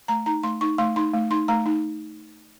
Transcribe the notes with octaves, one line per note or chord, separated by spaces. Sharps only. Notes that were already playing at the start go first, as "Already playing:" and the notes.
A3 A#5
D#4 A#5
A3 C6
D#4 C#6
A3 C6
D#4 C6
A3
D#4 C6
A3 A#5
D#4